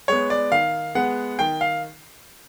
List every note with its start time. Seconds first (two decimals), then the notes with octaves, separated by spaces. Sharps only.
0.08 G#3 B3 C#5
0.30 D5
0.52 D#3 F5
0.95 G#3 B3 F#5
1.39 D#3 G5
1.61 F5